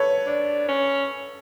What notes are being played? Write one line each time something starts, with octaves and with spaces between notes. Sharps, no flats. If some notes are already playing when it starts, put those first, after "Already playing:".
Already playing: A4 B4 C#5
D4
C#4